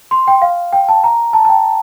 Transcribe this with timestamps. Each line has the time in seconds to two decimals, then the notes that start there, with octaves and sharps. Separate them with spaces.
0.11 C6
0.28 G5
0.42 F5
0.73 G5
0.89 A5
1.04 A#5
1.33 A5
1.45 A5
1.49 G5